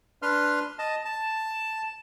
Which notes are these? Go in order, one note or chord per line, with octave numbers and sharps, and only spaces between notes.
D4 B4 C6 F6
D#5 A5
A5